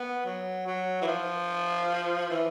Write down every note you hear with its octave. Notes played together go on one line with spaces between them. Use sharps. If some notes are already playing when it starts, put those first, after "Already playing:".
Already playing: B3
F#3
F#3
E3
F3
E3